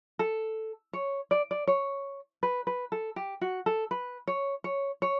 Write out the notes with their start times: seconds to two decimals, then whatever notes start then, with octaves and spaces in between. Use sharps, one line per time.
0.19 A4
0.93 C#5
1.31 D5
1.51 D5
1.67 C#5
2.43 B4
2.67 B4
2.92 A4
3.16 G4
3.41 F#4
3.66 A4
3.91 B4
4.27 C#5
4.64 C#5
5.02 C#5